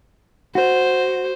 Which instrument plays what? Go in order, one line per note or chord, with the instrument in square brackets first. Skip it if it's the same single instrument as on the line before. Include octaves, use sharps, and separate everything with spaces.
[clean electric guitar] F#4 [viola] C5